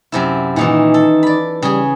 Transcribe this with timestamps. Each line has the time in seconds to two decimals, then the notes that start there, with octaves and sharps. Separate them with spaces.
0.12 F#2 C3 E4
0.56 A#2 D#3 E3 D#4
0.94 A4
1.23 D5 B5
1.62 C#3 G3 G#4